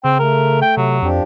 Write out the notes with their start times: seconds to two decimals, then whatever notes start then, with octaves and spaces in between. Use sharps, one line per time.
0.04 C#3 C4 G5
0.19 A3 A#4
0.62 G5
0.77 C3 F#3
1.02 F2 F3 D4 G4